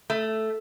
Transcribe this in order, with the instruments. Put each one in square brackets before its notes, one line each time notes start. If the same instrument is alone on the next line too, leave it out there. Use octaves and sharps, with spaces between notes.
[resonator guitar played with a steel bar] A3